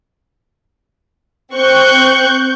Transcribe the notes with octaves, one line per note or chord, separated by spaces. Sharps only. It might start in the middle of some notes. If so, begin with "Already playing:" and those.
C4 C#6 F#6 G6